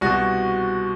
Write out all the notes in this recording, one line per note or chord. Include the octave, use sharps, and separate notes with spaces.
C2 B2 F#4